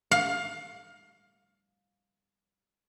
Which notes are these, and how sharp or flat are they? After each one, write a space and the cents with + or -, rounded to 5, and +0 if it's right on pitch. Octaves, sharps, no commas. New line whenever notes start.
F5 +20